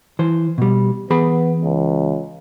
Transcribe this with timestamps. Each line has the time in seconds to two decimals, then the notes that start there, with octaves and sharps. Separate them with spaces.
0.19 E3 C5
0.58 B2 G3
1.10 E3 B3 G#4 B5
1.63 C#2